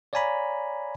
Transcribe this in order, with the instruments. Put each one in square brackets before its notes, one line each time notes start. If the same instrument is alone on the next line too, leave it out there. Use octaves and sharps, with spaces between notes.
[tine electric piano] C#5 D5 F5 G#5 A#5 B5